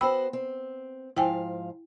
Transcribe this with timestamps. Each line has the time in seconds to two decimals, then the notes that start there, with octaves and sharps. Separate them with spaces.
0.01 B3 F#4 C5 G5 B5 E6
0.33 C4
1.16 G#2 F3 E4 F5 G5 G#5